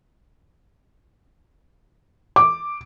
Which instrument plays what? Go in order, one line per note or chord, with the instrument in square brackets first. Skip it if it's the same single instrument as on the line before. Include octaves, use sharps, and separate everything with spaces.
[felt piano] D6